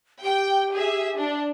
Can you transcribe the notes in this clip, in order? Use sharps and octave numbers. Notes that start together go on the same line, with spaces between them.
G4 G5
G#4 E5
D4